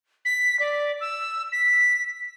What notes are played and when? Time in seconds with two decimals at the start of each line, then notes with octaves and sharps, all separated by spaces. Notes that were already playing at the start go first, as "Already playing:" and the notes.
0.25 B6
0.59 D5
1.01 E6
1.52 B6